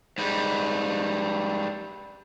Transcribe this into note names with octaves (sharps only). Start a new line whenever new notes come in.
G#2 G3